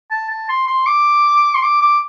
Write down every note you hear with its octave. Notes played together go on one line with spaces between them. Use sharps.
A5
A5
C6
C6
D6
C6
D6
D6